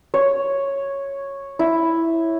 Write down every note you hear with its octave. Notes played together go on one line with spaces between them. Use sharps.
C#5
E4